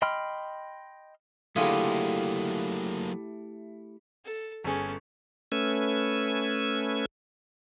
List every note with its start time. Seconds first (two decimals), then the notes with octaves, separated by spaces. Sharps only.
0.02 D#5 G5 B5 C6 F6
1.56 D3 F#3 A3 A#3 E4 F4 G4 G#4
4.25 A4
4.64 G1 C#4 G#4 A4
5.52 A3 C#4 B4 E6 G#6